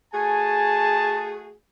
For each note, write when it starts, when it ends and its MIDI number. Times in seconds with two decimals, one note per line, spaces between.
0.14 1.56 57
0.14 1.56 66
0.14 1.56 68
0.14 1.27 80
0.14 1.33 81